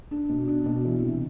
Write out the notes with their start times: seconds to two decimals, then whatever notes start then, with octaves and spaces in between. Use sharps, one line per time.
0.11 D4
0.29 B2
0.48 D4
0.66 B2
0.85 E3
1.02 C3